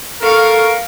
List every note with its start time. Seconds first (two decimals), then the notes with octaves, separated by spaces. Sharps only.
0.22 A4 A#4 F5 C#6